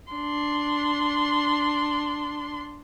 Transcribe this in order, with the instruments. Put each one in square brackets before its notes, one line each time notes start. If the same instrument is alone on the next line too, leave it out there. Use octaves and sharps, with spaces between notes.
[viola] D4 C6